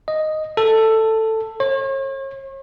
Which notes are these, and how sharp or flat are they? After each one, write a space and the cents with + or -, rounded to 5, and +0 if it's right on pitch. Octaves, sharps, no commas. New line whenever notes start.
D#5 +0
A4 +10
C#5 -40